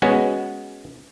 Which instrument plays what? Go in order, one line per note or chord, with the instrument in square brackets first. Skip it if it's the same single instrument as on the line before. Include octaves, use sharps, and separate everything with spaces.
[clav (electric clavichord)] G#3 B3 C#4 F#4